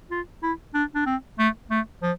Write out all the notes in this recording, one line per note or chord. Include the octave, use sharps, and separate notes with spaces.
F4
E4
D4
D4
C4
A3
A3
F3